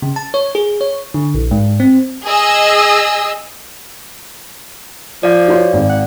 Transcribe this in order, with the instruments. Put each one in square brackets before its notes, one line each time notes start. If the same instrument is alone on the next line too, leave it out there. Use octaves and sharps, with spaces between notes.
[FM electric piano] C#3
A5
C#5
G#4
C#5
D3
A#1
G#2
C4
[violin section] G#4 D#5 E6
[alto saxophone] F3 [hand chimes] D5 F5
[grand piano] F#4 C5 C#5
G#1
[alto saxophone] F#5